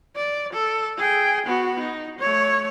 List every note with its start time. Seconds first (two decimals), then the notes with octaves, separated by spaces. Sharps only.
0.16 D5
0.53 A4
0.97 G#4 G5
1.46 B3 F#4
1.80 D#4
2.19 A3 C#5